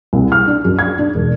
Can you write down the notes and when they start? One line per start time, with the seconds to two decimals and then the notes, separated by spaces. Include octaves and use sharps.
0.13 C2
0.32 F6
0.48 D4
0.65 F#2
0.79 G#6
0.99 D4
1.15 E1